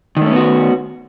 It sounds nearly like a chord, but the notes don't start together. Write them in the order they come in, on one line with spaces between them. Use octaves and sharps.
D#3 A3 C#4 B3 F#4